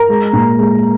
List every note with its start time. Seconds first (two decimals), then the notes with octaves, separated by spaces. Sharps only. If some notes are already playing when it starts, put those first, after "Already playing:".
Already playing: A#4 A#5
0.09 G#3
0.33 A#2
0.59 G#3